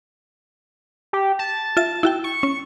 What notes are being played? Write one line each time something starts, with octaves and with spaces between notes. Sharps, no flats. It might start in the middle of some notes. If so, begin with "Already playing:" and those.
G4
A5
F4 E5 A6
E4 F#4 G5
C#6
C#4